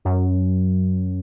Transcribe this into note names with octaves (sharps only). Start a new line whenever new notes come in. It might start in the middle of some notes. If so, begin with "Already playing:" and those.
F#2